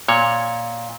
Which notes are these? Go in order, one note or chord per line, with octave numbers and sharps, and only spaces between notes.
A#2 C#5